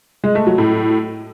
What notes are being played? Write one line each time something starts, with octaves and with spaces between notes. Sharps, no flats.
G#3
A3
F#3
A2